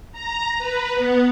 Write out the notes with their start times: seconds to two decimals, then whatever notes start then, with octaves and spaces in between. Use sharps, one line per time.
0.13 A#5
0.58 B4
0.94 B3